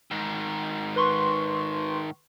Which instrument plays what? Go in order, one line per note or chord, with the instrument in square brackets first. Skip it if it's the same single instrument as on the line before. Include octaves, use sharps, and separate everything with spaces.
[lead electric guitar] G#2 D#3
[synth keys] B4 C6 C#6